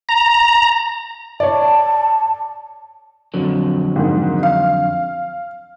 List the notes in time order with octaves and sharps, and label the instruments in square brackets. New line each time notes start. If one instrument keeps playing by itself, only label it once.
[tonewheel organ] A#5
[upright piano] C#5 D5 [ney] A5
[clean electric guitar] F2 D3 F#3
[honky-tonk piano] G#2 D#3
F5